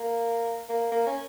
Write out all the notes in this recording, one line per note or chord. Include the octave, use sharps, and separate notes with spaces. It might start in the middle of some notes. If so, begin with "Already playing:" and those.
Already playing: A#3
A#3
A#3
C#4